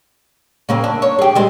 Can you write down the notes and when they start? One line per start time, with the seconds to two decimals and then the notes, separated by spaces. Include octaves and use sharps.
0.69 C#3 A#3 C4
0.84 D4
1.02 C#5
1.19 G4 G#4
1.35 G3 G#3 C4